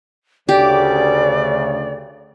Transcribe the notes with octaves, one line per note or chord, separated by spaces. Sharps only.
D2 C#3 G4 D5